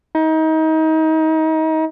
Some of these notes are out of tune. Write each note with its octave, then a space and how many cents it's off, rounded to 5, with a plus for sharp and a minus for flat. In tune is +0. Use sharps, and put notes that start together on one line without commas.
D#4 +30